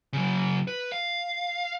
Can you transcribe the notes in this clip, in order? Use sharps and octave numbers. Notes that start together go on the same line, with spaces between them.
C#3 F#3
B4
F5